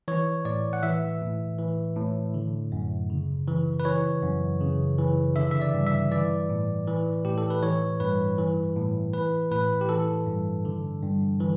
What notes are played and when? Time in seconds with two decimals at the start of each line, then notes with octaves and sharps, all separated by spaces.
0.08 E3 C#5
0.45 A2 D5
0.73 F#5
0.83 E3 E5
1.21 A2
1.59 E3
1.96 A2
2.34 D3
2.72 F#2
3.10 C#3
3.48 E3
3.80 B4
3.85 E3 C#5
4.23 F#2
4.61 C#3
4.98 E3
5.36 D3 E5
5.51 E5
5.62 D5
5.74 G2
5.87 E5
6.12 E3 D5
6.50 A2
6.87 E3
7.25 A2 G4
7.38 A4
7.50 B4
7.62 E3 C#5
8.00 G2 B4
8.38 E3
8.76 A2
9.13 E3 B4
9.51 A2 B4
9.81 G4
9.89 E3 A4
10.27 G2
10.65 D3
11.03 G2
11.40 E3